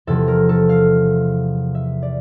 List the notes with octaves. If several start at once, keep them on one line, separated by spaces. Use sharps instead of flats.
E2 C3 F3 A4
A#4
A4
F5
E5
D5